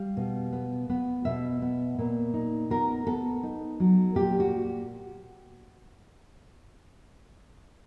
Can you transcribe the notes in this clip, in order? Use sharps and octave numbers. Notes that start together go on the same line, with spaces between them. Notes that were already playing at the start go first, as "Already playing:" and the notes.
Already playing: G3 F5
B2
B3
B3
B2 E5
B3
A#2
D#4
B3 A#4
B3 A4
D#4
F#3
A#2 G4
F#4